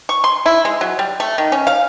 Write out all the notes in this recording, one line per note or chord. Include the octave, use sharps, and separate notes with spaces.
C#6
C6
E4
G#3
F#3
G3
A3
D#3
C#4
F5